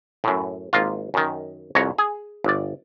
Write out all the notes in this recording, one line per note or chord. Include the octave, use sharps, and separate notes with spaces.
F#2 A2
G#1 A#3 F4
F#2 D#3
C2 F2 C#5 A#5
G#4
G1 D5